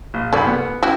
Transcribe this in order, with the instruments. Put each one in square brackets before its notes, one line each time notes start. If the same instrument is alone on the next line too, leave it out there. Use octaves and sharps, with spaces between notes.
[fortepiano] A#1
[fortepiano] C2 F#2 B5 [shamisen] A4 D5
[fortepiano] B3
[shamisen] C#4 F#4 G4 [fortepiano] E4